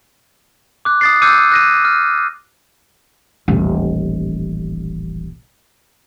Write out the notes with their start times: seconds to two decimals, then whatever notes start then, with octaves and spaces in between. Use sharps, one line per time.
0.85 D6 F#6
1.01 D#6 A6 C7
1.22 D6 E6 F#6 G6 C#7 D#7
1.52 F#6 A#6 D#7
1.85 F6
3.48 D#1 A1